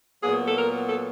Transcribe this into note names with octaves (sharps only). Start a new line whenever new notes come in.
A#2 F#3 B3 G#4
A4
A#4
A4